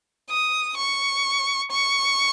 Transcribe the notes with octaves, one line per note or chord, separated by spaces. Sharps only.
D#6
C#6
C#6